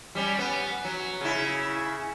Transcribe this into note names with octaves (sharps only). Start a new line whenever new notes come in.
G3 C#4
B3
F#3
C#3 E4